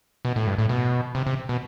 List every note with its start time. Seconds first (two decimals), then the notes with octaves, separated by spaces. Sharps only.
0.25 B2
0.36 A2
0.47 G2
0.58 A2
0.69 B2
1.15 C3
1.27 C3
1.49 B2